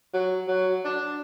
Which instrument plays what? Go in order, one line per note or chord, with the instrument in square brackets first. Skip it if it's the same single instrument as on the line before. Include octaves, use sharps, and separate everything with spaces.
[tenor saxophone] F#3
F#3
D4